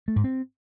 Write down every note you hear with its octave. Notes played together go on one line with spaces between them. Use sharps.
A3
G#2
C4